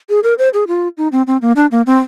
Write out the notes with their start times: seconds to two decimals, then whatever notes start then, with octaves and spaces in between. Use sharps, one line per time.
0.09 G#4
0.23 A#4
0.38 C5
0.54 G#4
0.68 F4
0.98 D#4
1.12 C4
1.27 C4
1.42 A#3
1.56 D4
1.71 A#3
1.86 C4